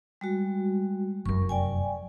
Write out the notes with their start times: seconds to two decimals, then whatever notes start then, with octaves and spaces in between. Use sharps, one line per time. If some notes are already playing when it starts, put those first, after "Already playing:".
0.21 G3 G#3 F#4
1.26 F1 F#2 A#4 C#6
1.49 D5 G5 G#5